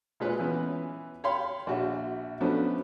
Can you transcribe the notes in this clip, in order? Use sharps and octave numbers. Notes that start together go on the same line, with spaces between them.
A#2 G#3 F4 B4 C#5
E3 B3 C#4
C#5 F5 G5 B5 C6
A#1 F#4 E5
F3 F#3 A3 B3 C#4 D4